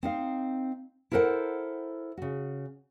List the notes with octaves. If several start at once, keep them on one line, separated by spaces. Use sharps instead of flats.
C4 D#4 F5
E4 A4 A#4 C5 F#5
C#3 F#4